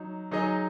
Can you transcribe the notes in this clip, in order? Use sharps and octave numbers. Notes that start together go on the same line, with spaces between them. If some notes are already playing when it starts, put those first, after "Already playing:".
Already playing: F#3 D#4
F#3 D#4 G#4 D#5